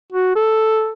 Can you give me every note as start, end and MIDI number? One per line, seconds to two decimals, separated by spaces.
0.12 0.34 66
0.36 0.91 69